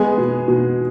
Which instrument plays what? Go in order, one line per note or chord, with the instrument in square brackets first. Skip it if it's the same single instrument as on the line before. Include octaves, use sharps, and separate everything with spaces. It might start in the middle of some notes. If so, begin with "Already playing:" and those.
Already playing: [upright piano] G#3 G#4 [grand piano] B3
[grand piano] B2
B2